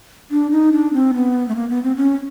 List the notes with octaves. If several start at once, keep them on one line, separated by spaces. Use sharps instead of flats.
D4
D#4
D4
C4
B3
A3
A#3
B3
C4
C#4